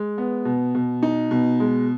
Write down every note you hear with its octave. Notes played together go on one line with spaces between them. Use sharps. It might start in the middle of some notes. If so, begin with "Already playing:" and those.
Already playing: G#3
B3
B2
B2
D#4
B2
G#3